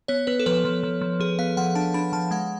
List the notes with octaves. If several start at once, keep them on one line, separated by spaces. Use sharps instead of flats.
B3 C#5
B3 B4
A4
F3 B4
F3
F3
F3
F3 G#4
B3 F5
F3 F#5
D4 A5
D4 B5
F3 A5
G#3 F#5